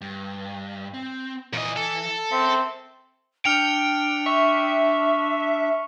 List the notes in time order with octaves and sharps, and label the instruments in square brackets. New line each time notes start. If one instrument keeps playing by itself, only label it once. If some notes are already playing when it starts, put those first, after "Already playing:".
[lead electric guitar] G2
C4
[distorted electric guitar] A#2 D#5 [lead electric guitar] E3
[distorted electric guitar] A4
[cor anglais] C4 [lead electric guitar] A#4 E5
[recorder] D4 [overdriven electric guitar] G5 [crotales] F6 C#7 F7
[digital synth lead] E5 [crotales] C#6